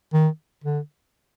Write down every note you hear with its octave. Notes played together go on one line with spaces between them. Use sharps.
D#3
D3